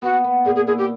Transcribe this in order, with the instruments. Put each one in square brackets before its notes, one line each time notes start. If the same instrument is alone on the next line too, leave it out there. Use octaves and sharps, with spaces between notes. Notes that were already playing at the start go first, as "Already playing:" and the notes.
[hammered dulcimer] B3 [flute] F#4
[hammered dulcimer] B3
[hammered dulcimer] A#2 [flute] G#4
[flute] G#4
[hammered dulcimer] E4 [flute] G#4
[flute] G4